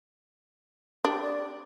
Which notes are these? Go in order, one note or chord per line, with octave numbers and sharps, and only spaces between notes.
D4 G4
D5